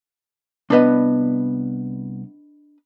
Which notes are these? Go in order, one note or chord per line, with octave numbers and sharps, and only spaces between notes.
C2 B3 D4 B4 D#5